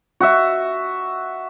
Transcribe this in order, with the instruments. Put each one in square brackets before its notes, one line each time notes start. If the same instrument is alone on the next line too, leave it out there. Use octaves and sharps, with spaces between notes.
[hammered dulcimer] F#4 E5